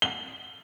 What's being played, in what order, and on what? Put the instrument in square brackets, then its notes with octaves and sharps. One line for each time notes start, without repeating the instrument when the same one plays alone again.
[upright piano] G7